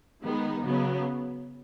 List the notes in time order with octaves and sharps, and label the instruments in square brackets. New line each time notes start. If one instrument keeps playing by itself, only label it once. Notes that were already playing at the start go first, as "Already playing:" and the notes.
[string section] D#3 G#3 B3 D#4
C#3 F#3 B3